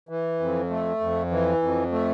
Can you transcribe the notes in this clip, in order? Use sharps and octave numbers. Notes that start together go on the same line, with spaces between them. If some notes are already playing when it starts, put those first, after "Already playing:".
E3
F2
A3
F2
E3
F2
A3